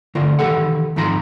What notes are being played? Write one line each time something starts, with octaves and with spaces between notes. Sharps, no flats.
D3 A3 F4 A#4
D#3 E3 G4 A4 F#5
F2 G#2 D#3 F4 A#5 C6